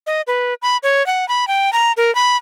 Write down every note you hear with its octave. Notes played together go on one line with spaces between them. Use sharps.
D#5
B4
B5
C#5
F#5
B5
G5
A#5
A#4
B5